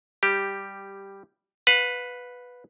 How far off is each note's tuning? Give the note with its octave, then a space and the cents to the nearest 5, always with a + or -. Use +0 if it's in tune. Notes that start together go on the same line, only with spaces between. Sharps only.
G3 +5 G4 +0
B4 +0 F5 +40